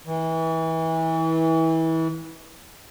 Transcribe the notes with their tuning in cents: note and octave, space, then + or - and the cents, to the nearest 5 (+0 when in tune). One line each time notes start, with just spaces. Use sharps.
E3 -25